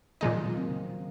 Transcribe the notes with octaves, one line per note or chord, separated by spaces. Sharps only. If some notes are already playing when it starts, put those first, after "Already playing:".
A#2 D#3 F3 G#3 D#4
F#3
A#3
C4
C#3